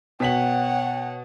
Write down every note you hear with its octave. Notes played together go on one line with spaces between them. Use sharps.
B2 C#5 F#5 G5 B6 F#7